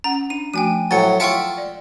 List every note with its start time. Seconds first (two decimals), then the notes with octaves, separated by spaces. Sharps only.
0.04 C#4 F#5 A#5
0.30 D4 D#7
0.54 F3 A3 F#4 G5 G#5 D#7
0.91 A2 F#3 C5 C#5 G#5 A6 C#7
1.20 F4 E5 F#5 G5 A5 C#6
1.58 D5